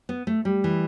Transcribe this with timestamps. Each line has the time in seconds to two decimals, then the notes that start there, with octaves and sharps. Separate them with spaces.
0.09 B3
0.27 A3
0.45 G3
0.64 E3